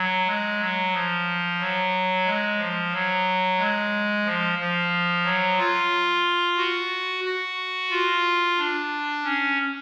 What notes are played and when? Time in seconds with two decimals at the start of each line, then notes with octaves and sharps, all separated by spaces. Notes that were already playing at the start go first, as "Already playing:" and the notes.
Already playing: F#3
0.27 G#3
0.59 F#3
0.93 F3
1.59 F#3
2.26 G#3
2.59 F3
2.92 F#3
3.58 G#3
4.25 F3
4.59 F3
5.24 F#3
5.58 F4
6.57 F#4
7.24 F#4
7.90 F4
8.58 D4
9.24 C#4